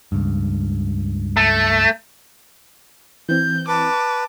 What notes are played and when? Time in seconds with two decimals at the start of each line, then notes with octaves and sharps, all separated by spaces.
0.12 C#2 G2
1.37 A3
3.29 E3 C4 G6
3.68 B4 A5 D6